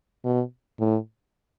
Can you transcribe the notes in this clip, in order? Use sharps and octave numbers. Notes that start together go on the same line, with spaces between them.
B2
A2